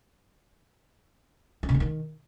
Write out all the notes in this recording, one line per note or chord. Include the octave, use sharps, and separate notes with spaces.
C#4
C#3
A#3
D#3